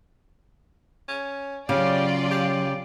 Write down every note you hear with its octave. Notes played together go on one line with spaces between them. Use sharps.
C#4
C#3 F#3 C#4 F4 G4 D5 F5
G4